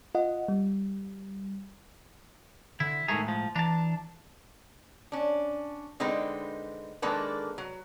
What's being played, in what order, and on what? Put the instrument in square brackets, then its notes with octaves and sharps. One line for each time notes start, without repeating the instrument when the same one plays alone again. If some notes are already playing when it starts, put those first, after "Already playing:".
[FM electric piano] F4 D#5 F#5
G3
[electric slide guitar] D3 [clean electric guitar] E4
[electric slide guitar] A2 G#3 A#5 [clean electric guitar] D#3 A3 G#4
[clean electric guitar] F3
[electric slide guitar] E3 A#5 [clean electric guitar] D4 A5
[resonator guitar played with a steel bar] C#4 D4
D3 G#3 C4 D#4 B4
D#3 G#3 A#3 D4 A4 B4
F#3